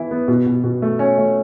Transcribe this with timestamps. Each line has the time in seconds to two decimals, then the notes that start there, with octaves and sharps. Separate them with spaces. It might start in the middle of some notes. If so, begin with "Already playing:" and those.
Already playing: E3 B3 E4
0.11 B3
0.28 B2
0.46 B2
0.64 B2
0.82 A3
0.99 C#4
1.18 A3